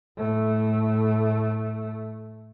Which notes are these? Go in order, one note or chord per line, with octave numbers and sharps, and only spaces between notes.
A2 A3